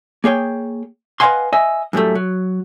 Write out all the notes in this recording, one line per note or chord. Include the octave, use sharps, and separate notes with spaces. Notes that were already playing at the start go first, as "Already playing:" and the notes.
A#3 G#4 C#5 G5
B4 D#5 F5 F#5 G#5 C6
D#5 E5 G#5
F#2 A2 G3 A3
F#3